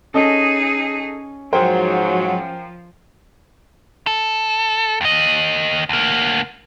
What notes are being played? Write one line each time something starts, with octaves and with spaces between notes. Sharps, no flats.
C#4 D#4 G#4 A4 D#5
G#2 F3 F#3 A#4 C5 G5
A4
D#2 D#5
D2 A#3